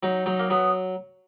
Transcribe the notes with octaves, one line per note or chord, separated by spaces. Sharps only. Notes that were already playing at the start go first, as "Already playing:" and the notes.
F#3 D#4
F#3 D#4
A#3
F#3 B3